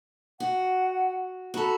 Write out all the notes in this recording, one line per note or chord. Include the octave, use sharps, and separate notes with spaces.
F#4 F#5
F#4 A4 A#5 B5